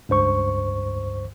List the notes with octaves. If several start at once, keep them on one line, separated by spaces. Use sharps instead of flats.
C#2 G2 C5 C#6